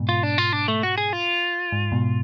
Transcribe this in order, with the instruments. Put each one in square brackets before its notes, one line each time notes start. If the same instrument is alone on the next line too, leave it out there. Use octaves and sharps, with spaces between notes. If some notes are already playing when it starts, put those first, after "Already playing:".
Already playing: [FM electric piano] G#2 B2
[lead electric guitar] F4
D4
F4
D4
A3
F#4
G#4
F4
[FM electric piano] G#2
G#2 B2